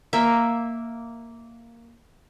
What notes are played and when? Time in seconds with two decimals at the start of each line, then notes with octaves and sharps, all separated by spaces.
0.13 A#3 E5